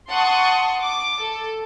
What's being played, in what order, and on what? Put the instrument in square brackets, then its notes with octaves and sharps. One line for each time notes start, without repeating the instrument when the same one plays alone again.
[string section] F#5 A5 C6 C#6 D#6
D6
A4